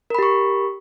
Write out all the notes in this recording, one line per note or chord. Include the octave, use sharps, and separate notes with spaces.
G4 A#4 B5 C#6